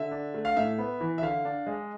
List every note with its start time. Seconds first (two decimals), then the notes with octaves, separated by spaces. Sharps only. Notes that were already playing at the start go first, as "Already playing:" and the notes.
Already playing: D3 E5
0.11 D4
0.34 A3
0.45 F5
0.57 A2 E5
0.78 B3
1.01 E3
1.18 E5
1.22 D3 F5
1.45 D4
1.67 G#3